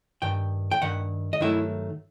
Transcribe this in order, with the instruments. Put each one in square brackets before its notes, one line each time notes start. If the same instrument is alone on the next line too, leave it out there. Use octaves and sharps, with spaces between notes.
[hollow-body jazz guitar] G2 D#3 G5
G5
G2 D#3 F#5
D#5
G2 D#3 F#3 A3 E4 E5